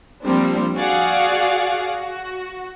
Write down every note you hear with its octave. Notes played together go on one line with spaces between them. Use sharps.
F3 G3 A#3 C4 D4
F#4 G#4 D5 F5 F#5
F#4